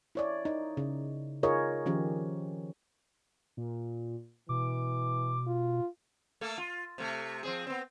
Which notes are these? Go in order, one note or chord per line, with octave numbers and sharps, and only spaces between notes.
E4 C#5 D5
D#4
C#3
D#4 F4 G#4 A#4 C#5 D#5
D#3 F3 C#4 G4
A#2
B2 E3 D6
F4
A3 A#3 A4
F4
C3 A3
F3 C4 G#4
B3 C4